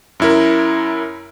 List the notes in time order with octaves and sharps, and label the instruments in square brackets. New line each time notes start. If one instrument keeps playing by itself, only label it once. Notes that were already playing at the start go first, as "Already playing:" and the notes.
[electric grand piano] F#2 E4 A#4